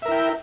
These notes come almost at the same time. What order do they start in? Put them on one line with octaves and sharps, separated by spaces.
E5 A#4 E4 G5